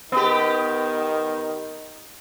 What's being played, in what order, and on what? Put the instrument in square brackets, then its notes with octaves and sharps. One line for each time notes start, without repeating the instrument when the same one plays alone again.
[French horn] D#3 [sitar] B3 G4